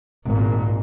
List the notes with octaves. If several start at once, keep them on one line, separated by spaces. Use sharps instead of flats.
G#1 A#2